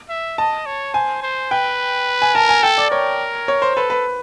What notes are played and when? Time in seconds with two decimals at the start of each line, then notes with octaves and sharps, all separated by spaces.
0.09 E5
0.38 D#5 A5
0.66 C#5
0.94 C5 G#5
1.23 C5
1.51 B4 G5
2.22 G#5
2.35 A#4 A5
2.49 G#5
2.63 A4 G5
2.78 D5
2.91 A#4 C#5
3.48 C#5
3.62 C5
3.76 A4 B4
3.90 B4